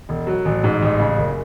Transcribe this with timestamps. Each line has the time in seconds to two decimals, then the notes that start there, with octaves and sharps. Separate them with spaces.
0.09 E1
0.27 F#3
0.45 A1
0.64 G#2
0.82 A1
0.99 C#3
1.18 F#1